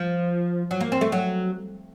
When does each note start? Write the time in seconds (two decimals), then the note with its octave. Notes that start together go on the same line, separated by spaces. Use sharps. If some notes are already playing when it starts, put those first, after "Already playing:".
Already playing: F3
0.71 F#3
0.81 A#3
0.92 C4
1.01 A3
1.12 F#3